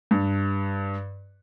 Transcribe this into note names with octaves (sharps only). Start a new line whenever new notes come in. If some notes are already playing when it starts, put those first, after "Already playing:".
G2